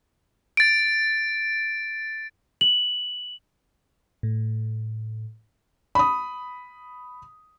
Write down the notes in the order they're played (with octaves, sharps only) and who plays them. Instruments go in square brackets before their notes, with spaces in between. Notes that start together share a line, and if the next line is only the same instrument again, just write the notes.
[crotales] A6 D7
[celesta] F#7
[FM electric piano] A2
[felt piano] B5 D#6